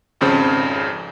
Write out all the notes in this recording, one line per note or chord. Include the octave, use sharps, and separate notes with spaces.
G#1 F2 C#3 C5